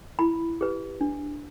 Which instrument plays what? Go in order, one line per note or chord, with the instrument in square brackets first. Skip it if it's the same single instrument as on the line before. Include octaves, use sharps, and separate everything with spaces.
[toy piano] E4 B5
G4 B4
D4